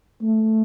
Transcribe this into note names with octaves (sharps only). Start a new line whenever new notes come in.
A3